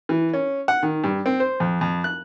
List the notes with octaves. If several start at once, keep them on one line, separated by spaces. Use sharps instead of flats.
E3
C#4
F#5
D#3
G2
C4
C5
F2
F2
F#6